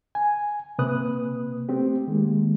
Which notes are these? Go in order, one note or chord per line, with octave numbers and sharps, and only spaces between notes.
G#5
C3 A#3 B4 D#6 F#6
A3 C4 G4
D#3 G#3 A#3